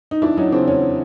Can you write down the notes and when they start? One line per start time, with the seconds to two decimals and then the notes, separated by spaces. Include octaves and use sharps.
0.11 D#4
0.22 E2 D4 E4
0.37 F#3 C#4 D#4
0.52 C#3 C4 D4
0.67 E2 C#4